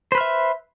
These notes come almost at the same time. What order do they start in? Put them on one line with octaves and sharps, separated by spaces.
C5 B4 F6 E5